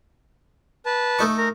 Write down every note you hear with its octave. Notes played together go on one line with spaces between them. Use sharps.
B4 A5
A3 D#4 C#6
A#4